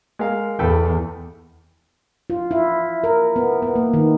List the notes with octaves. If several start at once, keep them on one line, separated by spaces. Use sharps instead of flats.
G#3 A#4 F5
E2 A4 B4 G5
F4
E4
A#4
B3
B3
A#3
D#3